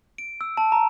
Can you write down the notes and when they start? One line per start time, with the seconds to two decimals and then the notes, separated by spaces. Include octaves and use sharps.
0.18 D7
0.41 E6
0.57 A5
0.72 A#5